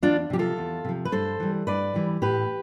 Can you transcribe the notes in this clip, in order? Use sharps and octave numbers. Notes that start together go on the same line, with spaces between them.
E2 D4 F4
C3 F3 G4
F4 A4
E2
C3 F3
B4
G2 A4 C5
E3 G3
G2 B4 D5
E3 G3
A2 G4 B4